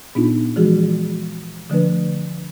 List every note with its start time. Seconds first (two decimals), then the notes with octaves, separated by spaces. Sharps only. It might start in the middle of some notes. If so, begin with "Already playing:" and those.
0.15 A#2 B3 D4 D#4 F4
0.56 E3 F3 G#3 F#4 G#4
1.70 D3 F3 A3 D4 B4